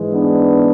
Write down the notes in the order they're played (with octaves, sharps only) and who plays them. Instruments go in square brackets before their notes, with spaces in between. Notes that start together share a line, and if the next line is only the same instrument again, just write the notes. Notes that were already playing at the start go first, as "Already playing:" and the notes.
Already playing: [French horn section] G#2 E3 G#3
B3 D4